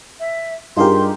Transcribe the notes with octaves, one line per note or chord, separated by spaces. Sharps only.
E5
G2 D#4 F4 G4 G#4 A#4 C6